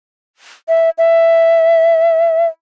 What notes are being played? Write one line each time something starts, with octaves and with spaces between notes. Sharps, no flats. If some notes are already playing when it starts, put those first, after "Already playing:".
E5
E5